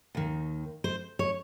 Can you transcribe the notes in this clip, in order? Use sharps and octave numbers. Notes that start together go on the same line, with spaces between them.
D#2 D#3
C5
C#5